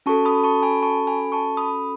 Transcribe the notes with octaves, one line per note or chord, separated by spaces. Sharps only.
C#4 F#4 A4 A5 C#6
B5 D#6
A5 C#6
G#5 B5
A5 C#6
G#5 B5
A5 C#6
B5 D#6